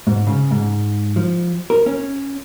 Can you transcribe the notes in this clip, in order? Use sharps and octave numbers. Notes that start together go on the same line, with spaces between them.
G#2
C#3
G#2
F3
A#4
C#4